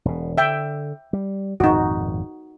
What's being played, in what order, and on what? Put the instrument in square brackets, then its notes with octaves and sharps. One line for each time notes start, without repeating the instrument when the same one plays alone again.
[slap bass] E1 B2
[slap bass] D3 [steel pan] E5 G5
[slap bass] G3
[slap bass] G#1 F2 A#2 [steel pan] D#4 F#4